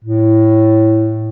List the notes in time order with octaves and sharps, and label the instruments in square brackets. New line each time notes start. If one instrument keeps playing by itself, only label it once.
[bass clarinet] A2